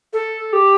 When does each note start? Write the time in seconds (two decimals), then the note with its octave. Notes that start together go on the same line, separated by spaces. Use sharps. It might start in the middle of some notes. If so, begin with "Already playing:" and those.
0.13 A4
0.53 G4